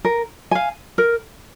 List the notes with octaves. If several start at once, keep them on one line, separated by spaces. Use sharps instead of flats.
A#4
F5 G#5
A#4